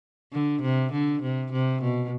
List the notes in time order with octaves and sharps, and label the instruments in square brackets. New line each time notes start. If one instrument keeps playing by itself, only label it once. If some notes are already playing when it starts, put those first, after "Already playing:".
[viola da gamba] D3
C3
D3
C3
C3
B2